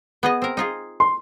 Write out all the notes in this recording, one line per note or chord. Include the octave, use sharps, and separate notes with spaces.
B3 G#4 D#5
C4 A#4
D#4 F4 G#4
C6